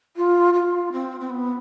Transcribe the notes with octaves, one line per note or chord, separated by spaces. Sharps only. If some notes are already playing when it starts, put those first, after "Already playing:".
F4
F4
C4
C4
B3